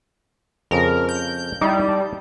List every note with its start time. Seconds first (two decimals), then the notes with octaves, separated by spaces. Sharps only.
0.71 F2 C#3 A#4
1.09 G6
1.61 G3 D#4 E4
1.89 A5